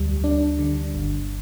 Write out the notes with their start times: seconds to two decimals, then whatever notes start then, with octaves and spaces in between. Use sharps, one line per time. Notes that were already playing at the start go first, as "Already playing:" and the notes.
Already playing: D2 G3
0.24 D4
0.59 D3
0.94 G1